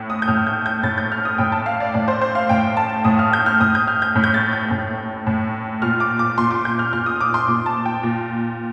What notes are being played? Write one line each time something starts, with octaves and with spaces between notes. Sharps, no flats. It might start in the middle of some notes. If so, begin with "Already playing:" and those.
Already playing: A2
D#6
G6
A2 F6
G6
G6
A2 A6
G6
F6
D#6
A2 G5
A5
F5
D5
A2 D5
C5
C5
F5
A2 G5
A5
A2 D#6
F6
G6
F6
A2 D#6
G6
F6
G6
A2
G6
A6
G6
A2
A2
A#2 F6
D6
D6
A#2 C6
D6
G6
F6
A#2 F6
D#6
D6
C6
A#2 D6
A5
G5
A#2